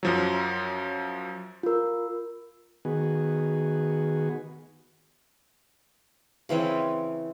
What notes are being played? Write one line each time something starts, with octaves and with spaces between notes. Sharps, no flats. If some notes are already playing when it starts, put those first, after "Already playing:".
F#2 F3 F#3
F4 A#4
D#3 B3 F#4 G#4
C#3 E3 C4 C#4